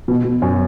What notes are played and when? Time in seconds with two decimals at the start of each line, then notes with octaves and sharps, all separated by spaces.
0.08 B2
0.25 B2
0.42 F#2